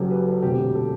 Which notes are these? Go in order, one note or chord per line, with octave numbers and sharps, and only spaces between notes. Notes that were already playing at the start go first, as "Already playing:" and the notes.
Already playing: F#1 F#2 F#3 G4 A4
B4
A4
E1 D2 C3 G4
A4